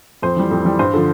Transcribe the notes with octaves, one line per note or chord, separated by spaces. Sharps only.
F2 C5
E3 G3
F2
E3 G3
G2 C5
D3 F3